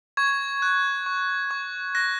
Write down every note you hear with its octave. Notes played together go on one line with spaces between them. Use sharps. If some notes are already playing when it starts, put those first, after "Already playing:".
C#6 G#6
F#6
C#6
C#6
F#6 A#6